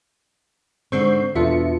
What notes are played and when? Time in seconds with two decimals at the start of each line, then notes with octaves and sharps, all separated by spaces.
0.92 G#2 D3 C4 C#6 G6 C7
1.35 E2 B2 D4 F4 A4 E5 C#7